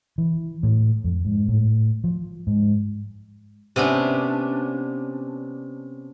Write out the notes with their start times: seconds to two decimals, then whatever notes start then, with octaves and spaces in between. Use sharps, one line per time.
0.18 E3
0.63 A2
1.04 F2
1.25 G#2
1.48 A2
2.04 F3
2.47 G#2
3.76 C3 B3 C#4 D4